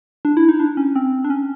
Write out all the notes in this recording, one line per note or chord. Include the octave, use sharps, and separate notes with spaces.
D4
E4
D#4
D4
C#4
C4
D4
C#4